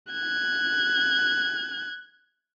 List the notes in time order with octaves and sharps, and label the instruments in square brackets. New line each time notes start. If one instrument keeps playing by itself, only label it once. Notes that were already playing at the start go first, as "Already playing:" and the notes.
[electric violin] F#6 G#6